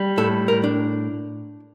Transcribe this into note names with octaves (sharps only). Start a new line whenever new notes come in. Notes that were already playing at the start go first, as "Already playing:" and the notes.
Already playing: G3
A2 A4
A#4
D4